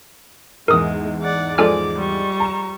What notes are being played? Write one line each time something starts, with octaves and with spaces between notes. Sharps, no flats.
E2 G#2 G#3 A#4 D#6
D5 F#5
F3 G#3 A4 D5 G#5 D6 F6
G3 C#6
A#5 E7